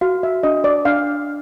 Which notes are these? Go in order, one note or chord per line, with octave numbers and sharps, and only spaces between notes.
F#4 F5
E5
D4 D#5
D5
D4 F5